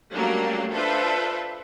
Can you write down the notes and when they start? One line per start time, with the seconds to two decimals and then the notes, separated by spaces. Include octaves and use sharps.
0.14 F#3 G3 A3 A#3 C#4 D4
0.73 D4 F4 A4 B4 C5 E5